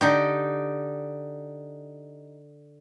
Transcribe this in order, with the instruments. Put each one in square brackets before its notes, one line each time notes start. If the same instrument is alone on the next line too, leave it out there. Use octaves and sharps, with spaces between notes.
[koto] D3 D#4 G4